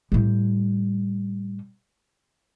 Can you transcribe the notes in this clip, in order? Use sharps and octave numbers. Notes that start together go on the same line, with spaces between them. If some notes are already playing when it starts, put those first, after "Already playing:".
A2 G3